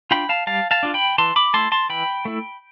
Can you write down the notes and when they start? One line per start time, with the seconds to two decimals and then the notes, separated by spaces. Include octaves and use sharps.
0.11 D4 F4 G5 B5
0.29 F5 A5
0.47 G3 F5 A5
0.71 F5 A5
0.83 D4 F4
0.94 G5 B5
1.18 E3 A5 C6
1.36 B5 D6
1.54 A3 E4 A5 C6
1.72 A5 C6
1.89 E3 G5 B5
2.25 A3 E4